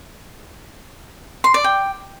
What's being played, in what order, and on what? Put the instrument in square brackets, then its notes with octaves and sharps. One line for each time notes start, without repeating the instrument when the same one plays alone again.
[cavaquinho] C6
D5
G5